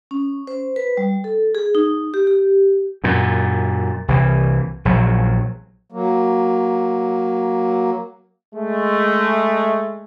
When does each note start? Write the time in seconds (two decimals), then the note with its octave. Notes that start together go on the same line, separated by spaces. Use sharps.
0.11 C#4
0.47 C5
0.76 B4
0.97 G3
1.24 A4
1.55 G#4
1.75 D#4
2.14 G4
2.27 G4
3.04 F#2 A#2
4.08 C2 E3
4.85 A#1 F#3
5.92 F#3 A#3
8.55 G#3 A3